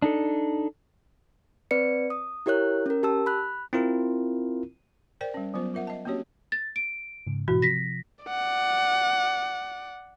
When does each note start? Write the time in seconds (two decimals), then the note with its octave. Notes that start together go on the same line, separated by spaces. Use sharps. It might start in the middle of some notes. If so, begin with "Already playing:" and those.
0.02 D4 D#4 A4
1.71 C4 B4 D5 C#7
2.10 D#6
2.46 E4 G4 A#4 C#5 F#6
2.86 C#4 A#4
3.03 G4 A5 E6
3.26 B5 F#6
3.73 C4 E4 F4 A#4
5.21 A#4 C5 D5 G5
5.34 G3 C#4
5.54 F#3 B3 F4 C5
5.74 F4 A#4 E5 F#5
5.87 D#5 A5
6.05 A#3 C4 C#4 F#4 G4 C#5
6.52 A6
6.76 D7
7.27 G#2 C#3
7.48 G#2 B2 E3 F#4
7.62 C3 F3 A#6 B6
8.25 D5 F#5